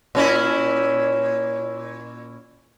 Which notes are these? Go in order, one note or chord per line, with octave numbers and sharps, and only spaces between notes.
A#2 C#4 E4